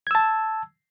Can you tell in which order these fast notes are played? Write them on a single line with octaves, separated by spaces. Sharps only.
G#6 E6 A5